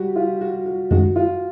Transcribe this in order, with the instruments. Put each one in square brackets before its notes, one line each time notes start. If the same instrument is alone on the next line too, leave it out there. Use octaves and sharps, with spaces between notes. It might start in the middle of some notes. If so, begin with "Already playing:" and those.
Already playing: [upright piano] G3 F#4 G4
F4
F#4
F#4
[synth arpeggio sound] F#2 D#3 G#3 [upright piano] F#4
[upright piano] F4